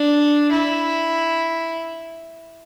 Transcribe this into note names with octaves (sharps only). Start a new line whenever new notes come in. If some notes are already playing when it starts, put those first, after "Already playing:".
Already playing: D4
E4